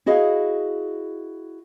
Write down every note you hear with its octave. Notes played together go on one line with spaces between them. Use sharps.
E4 F#4 G#4 D#5 F5